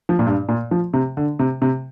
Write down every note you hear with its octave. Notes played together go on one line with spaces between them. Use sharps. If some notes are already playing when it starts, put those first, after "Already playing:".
F3
A#2
G2
A#2
F3
C3
D3
C3
C3